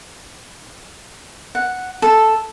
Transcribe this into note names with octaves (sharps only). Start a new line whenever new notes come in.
F#5
A4